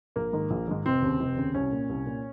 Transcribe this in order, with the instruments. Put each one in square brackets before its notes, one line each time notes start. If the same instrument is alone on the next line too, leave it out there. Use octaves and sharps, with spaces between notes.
[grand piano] A#1 A#3
G#2 D#3
A#1
G#2 D#3
F1 C4
D#2 C#3
F1
D#2 C#3
C2 C#4
A#2
C2
A#2